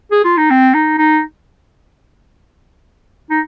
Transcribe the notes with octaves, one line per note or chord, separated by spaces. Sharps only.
G#4
F4
D#4
C4
D#4
D#4
D#4